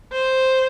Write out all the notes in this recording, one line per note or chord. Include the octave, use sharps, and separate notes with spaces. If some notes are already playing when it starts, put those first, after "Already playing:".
C5